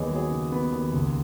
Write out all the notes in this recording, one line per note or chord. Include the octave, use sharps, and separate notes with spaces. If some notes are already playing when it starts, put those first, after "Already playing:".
Already playing: D#2 B3 G#4 B4 C#5 D#5
F#3 G#4 C#5
C#3
B3
D#2
C#2